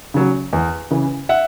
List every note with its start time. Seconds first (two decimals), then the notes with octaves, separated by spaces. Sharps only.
0.14 C#3 F#3
0.53 E2
0.91 C#3 E3
1.29 E5 F#5